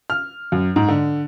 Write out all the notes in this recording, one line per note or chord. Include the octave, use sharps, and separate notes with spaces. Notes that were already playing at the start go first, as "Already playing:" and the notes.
F6
F#2
G#2
D3